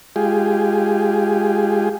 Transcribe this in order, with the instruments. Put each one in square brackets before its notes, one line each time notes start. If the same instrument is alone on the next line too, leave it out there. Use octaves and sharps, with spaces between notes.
[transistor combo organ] G#3 F4 G4 G#4